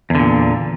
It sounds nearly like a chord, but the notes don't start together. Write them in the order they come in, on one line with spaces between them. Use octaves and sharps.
E2 D3 A#2